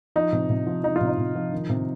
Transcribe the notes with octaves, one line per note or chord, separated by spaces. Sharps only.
F3 D#4
C3
C3
F3
F3 D#4
F4
C3
D#4
C3
F3
D#3
C3